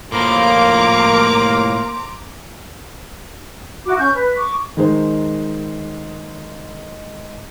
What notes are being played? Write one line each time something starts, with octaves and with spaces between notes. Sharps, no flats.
A2 F3 A#3 C5 A#5 D6
E4 F#4 D6
C#4 C#6 G6
B4
C#6 D6
D#3 G#3 D#4 C5